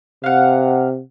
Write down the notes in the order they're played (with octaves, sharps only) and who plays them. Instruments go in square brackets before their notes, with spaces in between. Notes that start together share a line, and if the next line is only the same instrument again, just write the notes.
[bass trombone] C3 [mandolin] F5 F#5